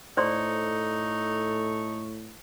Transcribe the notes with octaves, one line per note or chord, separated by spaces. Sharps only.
A2 D#4 A4 C5 D5 C6 C#6